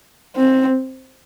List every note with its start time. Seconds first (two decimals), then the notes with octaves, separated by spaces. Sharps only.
0.36 C4